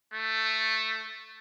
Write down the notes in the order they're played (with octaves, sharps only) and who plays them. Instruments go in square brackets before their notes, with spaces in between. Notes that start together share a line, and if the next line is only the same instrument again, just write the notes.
[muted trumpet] A3